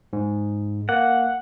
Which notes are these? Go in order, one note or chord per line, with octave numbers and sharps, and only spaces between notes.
G#2
A#3 F#5